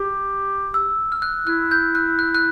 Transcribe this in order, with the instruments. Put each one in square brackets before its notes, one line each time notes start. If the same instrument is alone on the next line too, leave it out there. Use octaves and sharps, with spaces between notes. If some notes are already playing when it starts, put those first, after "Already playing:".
Already playing: [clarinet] G4
[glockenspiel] E6
F6
F#6
[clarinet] E4 [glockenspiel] F#6
[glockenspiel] G6
F#6
F#6
F#6